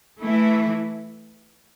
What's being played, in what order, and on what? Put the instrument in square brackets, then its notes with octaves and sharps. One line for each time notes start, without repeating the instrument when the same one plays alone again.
[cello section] E3 A3 E4